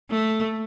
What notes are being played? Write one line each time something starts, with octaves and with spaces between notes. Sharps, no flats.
A3